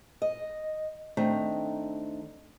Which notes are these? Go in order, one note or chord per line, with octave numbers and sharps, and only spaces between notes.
D#5
D#3 A3 C4 D4 A#5